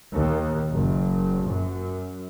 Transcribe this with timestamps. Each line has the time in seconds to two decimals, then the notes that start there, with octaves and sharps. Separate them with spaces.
0.12 D#2
0.73 F#1
1.46 F#2